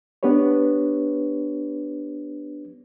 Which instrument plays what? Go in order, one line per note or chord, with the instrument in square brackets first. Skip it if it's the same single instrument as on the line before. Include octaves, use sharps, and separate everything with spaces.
[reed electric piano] B3 D4 G4 B4 C#5